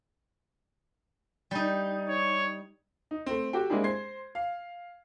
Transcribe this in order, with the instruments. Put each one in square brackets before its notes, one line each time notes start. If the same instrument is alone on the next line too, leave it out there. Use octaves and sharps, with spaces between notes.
[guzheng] G3 D#4
[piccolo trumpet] C#5
[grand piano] D#4
A3 C4
F#4 G4 A4 G5
G#3 A#3 C4 D4 E4 G#4
C5 G#6 C7
F5